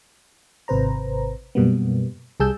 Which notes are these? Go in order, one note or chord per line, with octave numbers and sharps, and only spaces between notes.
G#1 C3 B4 C5 A#5
F#2 B2 G3 A#3 B3
C2 G3 G#4 A5 E6 G6